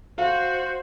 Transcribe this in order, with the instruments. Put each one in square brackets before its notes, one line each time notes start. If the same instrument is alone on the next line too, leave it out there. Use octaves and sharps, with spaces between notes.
[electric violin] F#4 [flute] C5 [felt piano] F5